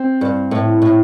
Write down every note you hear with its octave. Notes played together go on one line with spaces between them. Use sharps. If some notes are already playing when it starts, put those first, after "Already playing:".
Already playing: C4
G2
A2
A2